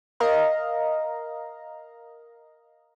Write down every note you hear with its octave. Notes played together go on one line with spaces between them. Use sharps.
A#4 D#5 F5 A#5